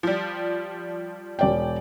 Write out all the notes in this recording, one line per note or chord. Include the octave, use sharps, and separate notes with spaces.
F3 G3
E1 D5 G5